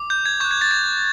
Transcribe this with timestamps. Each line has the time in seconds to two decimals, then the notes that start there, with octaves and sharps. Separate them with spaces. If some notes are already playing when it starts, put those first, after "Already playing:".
Already playing: D6
0.10 G6
0.26 G#6
0.40 C#6 G6
0.45 F#6
0.51 G#6
0.61 A6
0.71 G#6